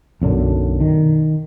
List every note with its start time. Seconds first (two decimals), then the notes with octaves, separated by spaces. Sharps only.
0.22 B1 F#2 D3
0.81 D#3